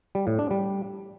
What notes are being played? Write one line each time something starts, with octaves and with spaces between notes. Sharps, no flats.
G3
A2
D4
G3